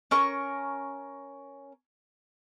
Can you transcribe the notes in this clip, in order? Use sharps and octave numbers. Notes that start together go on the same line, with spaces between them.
C#4 A#4 C#6